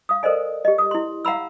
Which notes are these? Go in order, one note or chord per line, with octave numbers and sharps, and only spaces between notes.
F5 D#6
A4 A#4 C5 D5 D#5 G#5
G4 D#5
D#6
E4 C6
F5 F#5 A#5 B5 E6